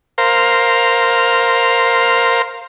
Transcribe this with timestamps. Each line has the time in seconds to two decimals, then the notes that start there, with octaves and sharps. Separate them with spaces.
0.18 A#4 C5 F5